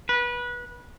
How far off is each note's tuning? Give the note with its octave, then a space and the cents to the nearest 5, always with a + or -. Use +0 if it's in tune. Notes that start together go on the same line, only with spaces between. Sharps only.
B4 -25